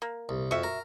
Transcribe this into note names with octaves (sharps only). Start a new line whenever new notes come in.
A#3
C2
F2 F#4 E5
A#4